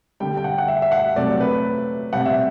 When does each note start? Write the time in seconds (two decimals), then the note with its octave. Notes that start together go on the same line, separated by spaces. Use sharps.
0.20 D3 G3 G5
0.37 G5
0.44 F#5
0.58 F#5
0.68 E5
0.82 E5
0.92 F#5
1.16 C3 F#3 A3 D5
1.40 B4
2.13 C3 G3 F#5
2.25 E5